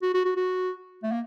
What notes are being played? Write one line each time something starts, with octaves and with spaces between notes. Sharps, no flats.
F#4
F#4
F#4
F#4
A3
A#3